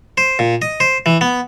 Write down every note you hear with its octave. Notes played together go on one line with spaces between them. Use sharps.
C5
A#2
D#5
C5
E3
B3